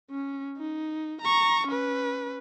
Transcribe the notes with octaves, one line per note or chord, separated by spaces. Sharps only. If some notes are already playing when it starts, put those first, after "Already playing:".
C#4
D#4
A#5 C#6
C#4 B4